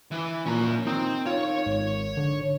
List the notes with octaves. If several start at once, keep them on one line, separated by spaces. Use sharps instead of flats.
E3
A#2 C#4 A#5
D#3 C4 D#4
F4 C#5
G#1
D3